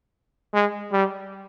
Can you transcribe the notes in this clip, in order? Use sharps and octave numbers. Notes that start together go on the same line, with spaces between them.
G#3
G3